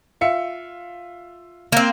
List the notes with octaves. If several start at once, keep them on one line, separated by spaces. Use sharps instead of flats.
F4 E5 C#7
A#3 C4